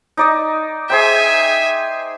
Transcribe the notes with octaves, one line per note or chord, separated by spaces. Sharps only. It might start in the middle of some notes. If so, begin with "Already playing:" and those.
D#4 D5 D#5
G#4 C5 E5 G5 G#5